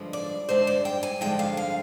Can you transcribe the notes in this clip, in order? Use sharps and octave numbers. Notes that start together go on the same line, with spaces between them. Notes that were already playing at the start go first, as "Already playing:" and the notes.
Already playing: G2 D3 F3 G#3
D5
G2 D3 F3 G#3 C5
D5
G5
G#5
G2 D3 F3 G#3 G5
F5
F5